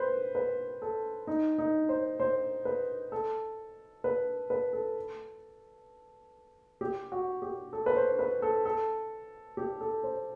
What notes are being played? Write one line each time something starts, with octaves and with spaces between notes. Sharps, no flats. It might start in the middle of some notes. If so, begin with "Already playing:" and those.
Already playing: B4 C5
B4
A4
D#4
D#4
C5
C5
B4
A4
B4
B4
A4
G4
F#4
G4
A4
B4
C5
B4
A4
A4
G4
A4
C5